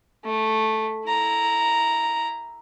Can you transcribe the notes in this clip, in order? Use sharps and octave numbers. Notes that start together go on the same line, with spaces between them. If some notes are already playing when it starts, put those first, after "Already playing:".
A3
E4 A#5